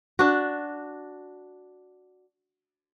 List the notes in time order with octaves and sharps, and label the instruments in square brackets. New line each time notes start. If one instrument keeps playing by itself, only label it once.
[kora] D4 F#4